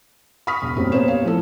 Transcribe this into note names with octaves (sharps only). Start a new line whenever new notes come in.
B5 C#6 D#6 F6 B6
E1
F#2 A2 G3 A#3 C4
A#3 B3 C5 C#5 E7
C#5 F5
F3 A3 E4 A4